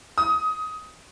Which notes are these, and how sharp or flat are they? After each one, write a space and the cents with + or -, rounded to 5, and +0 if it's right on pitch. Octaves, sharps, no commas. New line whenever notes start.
D#6 +20